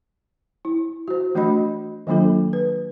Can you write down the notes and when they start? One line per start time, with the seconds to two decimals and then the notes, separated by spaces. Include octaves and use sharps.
0.65 E4
1.08 F#4 C5
1.35 E3 A3 D4 F#4 D#5 B5
2.07 D#3 F#3 A#3 D4 F4 A4
2.53 B4